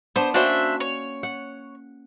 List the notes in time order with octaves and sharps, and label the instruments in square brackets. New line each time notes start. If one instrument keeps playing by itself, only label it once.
[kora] B3 D4 [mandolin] C5
[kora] A#3 C#4 F#4 [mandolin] D4 C5 E5
[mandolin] C#5
[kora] F#5